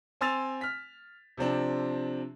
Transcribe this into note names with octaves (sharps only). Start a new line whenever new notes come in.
C4 G#5 C6 E6 A6 F7
F6 B6
C3 F3 C4 D4